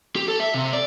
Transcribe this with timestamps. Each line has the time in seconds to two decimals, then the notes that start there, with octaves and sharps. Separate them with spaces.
0.16 G4
0.28 A4
0.40 E5
0.54 C3
0.73 D5